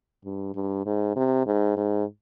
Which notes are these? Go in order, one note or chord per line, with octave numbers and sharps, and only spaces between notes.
G2
G2
G#2
C3
G#2
G#2